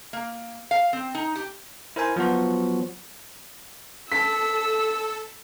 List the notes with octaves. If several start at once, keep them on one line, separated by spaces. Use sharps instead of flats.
A#3
F5
C4
D#4
G4
E4 A#4 C5 E5 G#5
F3 F#3 B3 F#4
A4 A5 E6 B6